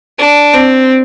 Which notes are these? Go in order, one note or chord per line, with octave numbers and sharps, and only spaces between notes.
D4
C4